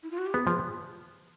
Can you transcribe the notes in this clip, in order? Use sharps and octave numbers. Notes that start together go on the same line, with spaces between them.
E4
F4
F#4
G4
B3 G#4
F3 G#4